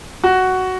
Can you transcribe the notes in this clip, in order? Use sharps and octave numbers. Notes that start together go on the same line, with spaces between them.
F#4